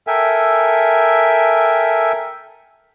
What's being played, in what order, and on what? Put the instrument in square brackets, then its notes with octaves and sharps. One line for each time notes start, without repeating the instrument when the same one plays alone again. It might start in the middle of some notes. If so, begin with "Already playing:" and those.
[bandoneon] A4 A#4 E5 G5 G#5